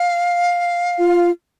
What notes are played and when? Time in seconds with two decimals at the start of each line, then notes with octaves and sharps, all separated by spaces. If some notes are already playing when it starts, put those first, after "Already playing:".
Already playing: F5
0.98 F4